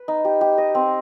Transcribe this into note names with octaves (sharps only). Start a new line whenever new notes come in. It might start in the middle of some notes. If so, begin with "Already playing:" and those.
Already playing: B4
D#4
G4
G4
D#5
C4